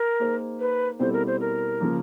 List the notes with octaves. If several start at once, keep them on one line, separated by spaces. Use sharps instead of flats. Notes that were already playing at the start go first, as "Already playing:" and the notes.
Already playing: A#4
A#3 D#4 G#4 C5
B4
B2 G3 C4 E4 A4 C5
A#4
C5
A#4
C#3 F3 A#3